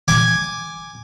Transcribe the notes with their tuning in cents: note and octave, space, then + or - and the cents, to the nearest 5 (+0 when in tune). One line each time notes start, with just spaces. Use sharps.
G#5 +0 D6 +0